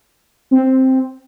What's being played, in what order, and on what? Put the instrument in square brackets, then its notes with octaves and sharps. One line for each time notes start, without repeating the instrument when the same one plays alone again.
[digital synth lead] C4